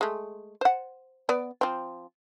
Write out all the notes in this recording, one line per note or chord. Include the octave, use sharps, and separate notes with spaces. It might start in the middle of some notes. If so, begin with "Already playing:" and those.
G#3 A3
C5 F#5
B3 D5
F3 C4